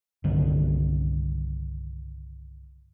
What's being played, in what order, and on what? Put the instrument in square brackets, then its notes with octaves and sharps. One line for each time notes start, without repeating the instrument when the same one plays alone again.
[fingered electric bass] C2 G2 D3 D#3